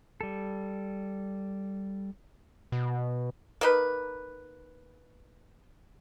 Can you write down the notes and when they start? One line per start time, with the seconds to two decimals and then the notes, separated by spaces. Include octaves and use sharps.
0.21 G3 A4
2.72 B2
3.61 A#3 D#4 B4